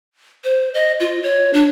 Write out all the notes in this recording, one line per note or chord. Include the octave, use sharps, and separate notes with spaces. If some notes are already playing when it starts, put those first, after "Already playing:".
C5
D#5
F4
C#5
D4